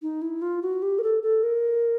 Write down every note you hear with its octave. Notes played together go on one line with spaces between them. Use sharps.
D#4
E4
F4
F#4
G4
A#4
A4
A4
A#4